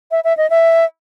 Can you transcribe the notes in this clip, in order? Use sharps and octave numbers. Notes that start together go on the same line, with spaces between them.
E5
E5
D#5
E5